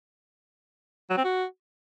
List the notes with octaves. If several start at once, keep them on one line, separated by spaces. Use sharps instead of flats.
F#3
C4
F#4